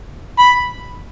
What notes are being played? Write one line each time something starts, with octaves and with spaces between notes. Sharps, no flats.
B5